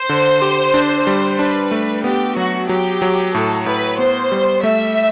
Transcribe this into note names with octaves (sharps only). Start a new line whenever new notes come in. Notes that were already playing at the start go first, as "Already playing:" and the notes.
Already playing: C5
D3
G4
D4
G3
D4 B4
A3
B3 G4
F#3 F#4
F#3 G4
F#3
A2 A4
A2 B4
B3 C5
G3
A3 E5